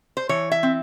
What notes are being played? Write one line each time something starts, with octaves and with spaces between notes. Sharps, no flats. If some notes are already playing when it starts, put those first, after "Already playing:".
C5
E3 C#5
E5
C4